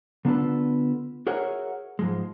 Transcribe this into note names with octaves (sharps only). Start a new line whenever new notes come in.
D3 B3 D4 F4 A4 B4
F#4 G#4 A#4 C#5 E5 F#5
G#2 F3 G#3